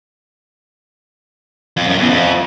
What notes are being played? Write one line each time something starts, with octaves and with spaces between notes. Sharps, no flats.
F2
F#2
E2
F2